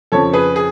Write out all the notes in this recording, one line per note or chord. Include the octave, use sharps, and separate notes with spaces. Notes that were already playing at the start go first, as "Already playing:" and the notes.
F2 C#3 F3 A4 C#5
G#4 B4
G#4